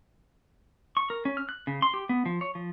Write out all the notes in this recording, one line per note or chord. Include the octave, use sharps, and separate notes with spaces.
C#6
A#4
C#4
F6
F#6
C#3
C6
G4
B3
F3
C#5
F3